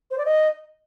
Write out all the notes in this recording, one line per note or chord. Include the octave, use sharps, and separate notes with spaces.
C5
D5
D#5